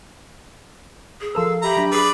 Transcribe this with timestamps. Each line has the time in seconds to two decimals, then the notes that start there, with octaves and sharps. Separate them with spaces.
1.21 G#4
1.35 F3 A4 A#4 F5 E6
1.62 G4 E5 A#5 B5
1.77 F#3 D4
1.92 G#4 B4 D5